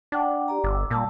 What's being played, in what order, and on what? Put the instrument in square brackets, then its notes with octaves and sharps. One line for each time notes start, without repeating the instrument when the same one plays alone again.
[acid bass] D4 [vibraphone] F#5 G5 D6
[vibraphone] G4 D5 A#5
[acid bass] G1 [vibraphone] D6 E6
[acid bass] A#2 [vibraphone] G3 A5 E6